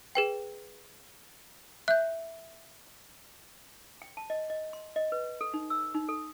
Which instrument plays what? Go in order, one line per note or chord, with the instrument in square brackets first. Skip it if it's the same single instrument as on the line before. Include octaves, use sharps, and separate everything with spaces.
[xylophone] G#4 B4 G5
[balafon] E5 [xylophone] F#6 G6
[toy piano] G5
A5
D#5
D#5
C6
D#5
B4
A4
D#4
E6
D#4
A4